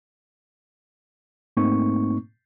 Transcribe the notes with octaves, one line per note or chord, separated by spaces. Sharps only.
G#2 A3 A#3 C4 D#4 C#6